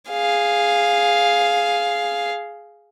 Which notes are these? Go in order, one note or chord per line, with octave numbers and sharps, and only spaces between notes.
G#4 F5